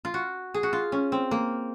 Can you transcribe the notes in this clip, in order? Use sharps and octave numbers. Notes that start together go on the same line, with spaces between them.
F4
F#4
G#4
F#4
F4
C#4
C4
A#3